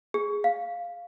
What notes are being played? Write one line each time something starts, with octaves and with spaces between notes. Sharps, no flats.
G#4
F5